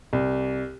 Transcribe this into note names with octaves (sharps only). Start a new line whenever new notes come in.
C2